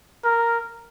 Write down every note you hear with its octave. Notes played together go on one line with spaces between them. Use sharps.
A#4